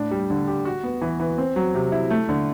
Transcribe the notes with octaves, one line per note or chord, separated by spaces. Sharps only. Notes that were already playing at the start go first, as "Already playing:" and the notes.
Already playing: A2 D4
G3
D3
G4
F#4
B3
E3
E3
C4
F#3
C3
E4
A3
D3